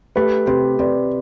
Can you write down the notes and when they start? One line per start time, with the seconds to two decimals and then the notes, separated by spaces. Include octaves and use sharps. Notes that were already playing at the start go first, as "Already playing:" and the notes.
0.16 A3 G4 B4
0.47 C3 G4 B4
0.79 C3 B4 D5